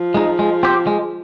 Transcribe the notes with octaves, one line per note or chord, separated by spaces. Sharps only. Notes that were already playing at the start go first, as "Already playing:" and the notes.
Already playing: F3
G#3 D#4
G#3
C4 G4
G#3